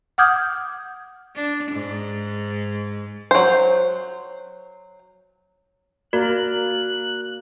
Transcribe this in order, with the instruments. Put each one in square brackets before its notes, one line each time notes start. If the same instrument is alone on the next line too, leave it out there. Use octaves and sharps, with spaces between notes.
[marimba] F#5 D6 D#6 F6 G6 G#6
[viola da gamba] D4
G#2
[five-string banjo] F#3 C5
[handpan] A#3 A#4 D5 [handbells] F#4 [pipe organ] F#6